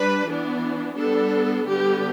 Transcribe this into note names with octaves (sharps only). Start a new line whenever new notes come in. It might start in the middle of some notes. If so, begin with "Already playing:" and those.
Already playing: G3 D4 B4
E3 B3 D4
G3 B3 D4 A4
D3 G3 B3 G4